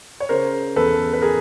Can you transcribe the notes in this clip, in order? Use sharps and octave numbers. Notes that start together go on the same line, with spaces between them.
C#5
C#3 A#4 C5
E2 A4 B4
B4
G#4 A#4